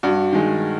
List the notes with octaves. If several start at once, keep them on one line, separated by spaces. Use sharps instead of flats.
G2 F#4
D#3 G#3